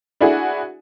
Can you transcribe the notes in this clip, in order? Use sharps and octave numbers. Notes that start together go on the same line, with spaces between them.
D4 E4 F#4 G#4